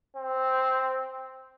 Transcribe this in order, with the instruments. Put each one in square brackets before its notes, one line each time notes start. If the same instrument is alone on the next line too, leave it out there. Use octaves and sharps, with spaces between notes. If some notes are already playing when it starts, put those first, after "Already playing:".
[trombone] C4